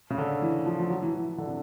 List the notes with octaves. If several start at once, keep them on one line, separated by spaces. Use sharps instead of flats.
C#3
D3
E3
F3
F3
F#3
E3
E3
D3
C3